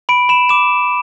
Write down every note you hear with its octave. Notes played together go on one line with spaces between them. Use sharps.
B5 D7
B5 E7
D6 E7